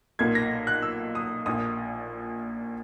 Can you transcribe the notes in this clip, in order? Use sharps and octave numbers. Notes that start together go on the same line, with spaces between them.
B1 A#2 A#3 G#6
A#6
F#6
E6
D#6
A#1 A#2 A#3 D#6